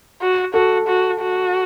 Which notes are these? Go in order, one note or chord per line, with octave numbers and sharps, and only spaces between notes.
F#4
F#4 A4
F#4
F#4